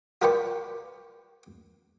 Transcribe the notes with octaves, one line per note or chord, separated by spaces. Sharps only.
F4 A#4 B4 D5 G5 C#6